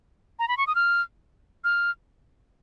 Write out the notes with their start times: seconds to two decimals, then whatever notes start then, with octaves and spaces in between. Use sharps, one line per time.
0.39 A#5
0.48 B5
0.57 C#6
0.67 D#6
0.75 F6
1.64 F6